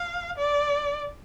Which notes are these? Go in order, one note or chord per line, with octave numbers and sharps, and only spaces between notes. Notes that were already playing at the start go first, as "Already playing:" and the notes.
Already playing: F5
D5